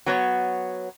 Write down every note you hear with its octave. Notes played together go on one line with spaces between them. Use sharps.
F#3 B3 C#5